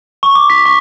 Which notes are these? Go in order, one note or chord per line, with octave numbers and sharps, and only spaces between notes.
C#6
D6
B6
C#6